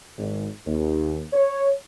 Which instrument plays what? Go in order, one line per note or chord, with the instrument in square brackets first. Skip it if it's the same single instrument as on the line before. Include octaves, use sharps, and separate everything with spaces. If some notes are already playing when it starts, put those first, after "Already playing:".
[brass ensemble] G#1
D#2
C#5